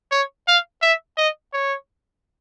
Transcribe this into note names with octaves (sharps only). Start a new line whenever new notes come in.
C#5
F5
E5
D#5
C#5